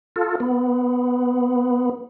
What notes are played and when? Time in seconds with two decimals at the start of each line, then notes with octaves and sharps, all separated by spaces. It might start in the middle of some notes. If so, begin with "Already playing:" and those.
0.16 F4 A4
0.40 B3